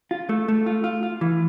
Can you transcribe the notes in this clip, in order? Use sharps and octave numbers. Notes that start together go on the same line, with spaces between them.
F4
A3
A3
F4
F4
F4
E3